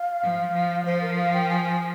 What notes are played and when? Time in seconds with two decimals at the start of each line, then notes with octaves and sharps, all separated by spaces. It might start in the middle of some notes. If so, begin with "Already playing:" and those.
Already playing: F5
0.23 F3
0.54 F3
0.85 F3 C5
1.02 A#4
1.18 F5
1.33 G5
1.49 G#5